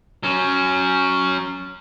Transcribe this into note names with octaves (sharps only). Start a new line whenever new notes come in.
F#3 C#4